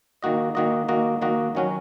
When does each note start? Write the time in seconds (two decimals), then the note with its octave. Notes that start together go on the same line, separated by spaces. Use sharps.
0.23 D#3 A#3 F#4 D#5
0.55 D#3 A#3 F#4 D#5
0.88 D#3 A#3 F#4 D#5
1.22 D#3 A#3 F#4 D#5
1.55 D#3 F#3 C#4 F#4